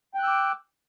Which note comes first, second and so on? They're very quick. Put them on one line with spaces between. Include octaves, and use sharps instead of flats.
G5 F#6 E6 D6